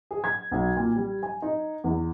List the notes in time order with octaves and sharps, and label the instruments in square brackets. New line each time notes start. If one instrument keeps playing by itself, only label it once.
[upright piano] G#4
G#6
B1
A#2
G3
G#5
D#4
E2